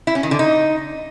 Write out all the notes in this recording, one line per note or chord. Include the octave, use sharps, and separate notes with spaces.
E4
C#4
D#3
D3
D#4